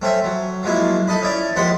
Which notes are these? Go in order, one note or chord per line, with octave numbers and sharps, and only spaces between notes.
A3 C4 C#4 E5
F#3
F3 F#3 G#3 A#3 E4
D#4 A4 D#5 B5
C#4 E4 D5
D#2 F3 G#3 F#5 B5 C6